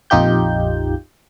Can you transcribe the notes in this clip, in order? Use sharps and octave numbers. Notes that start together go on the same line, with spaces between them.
A#1 F2 D#4 F4 G4 G6